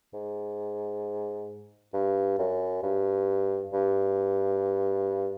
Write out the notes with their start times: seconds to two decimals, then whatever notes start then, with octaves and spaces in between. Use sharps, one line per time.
0.13 G#2
1.94 G2
2.38 F#2
2.83 G2
3.73 G2